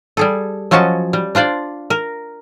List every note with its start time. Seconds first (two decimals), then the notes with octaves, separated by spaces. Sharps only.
0.17 G3 G#4 A4
0.71 F3 F#3 C#4 F#4 D#5 A5
1.13 G3
1.35 D4 F4 C5 D5
1.90 A#4